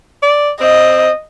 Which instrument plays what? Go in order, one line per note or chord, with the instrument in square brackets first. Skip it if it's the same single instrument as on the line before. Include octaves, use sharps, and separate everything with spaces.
[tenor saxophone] D5
[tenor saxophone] C4 [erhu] D#5